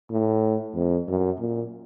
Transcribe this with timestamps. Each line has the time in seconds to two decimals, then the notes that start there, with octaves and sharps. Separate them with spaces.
0.11 A2
0.74 F2
1.08 F#2
1.40 A#2